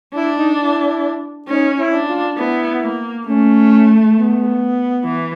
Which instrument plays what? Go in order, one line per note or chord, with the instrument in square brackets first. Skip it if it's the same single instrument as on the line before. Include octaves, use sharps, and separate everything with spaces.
[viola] D4 [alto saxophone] E4
[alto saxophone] D#4
E4
[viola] C#4 [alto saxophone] D#4
[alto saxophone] E4
[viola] D4
[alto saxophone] F4
[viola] B3 [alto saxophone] E4
[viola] A#3
[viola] A3 [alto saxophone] C#4
[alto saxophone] B3
[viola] E3